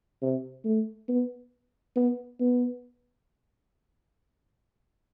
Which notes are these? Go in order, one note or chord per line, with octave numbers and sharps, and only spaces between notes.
C3
A3
B3
B3
B3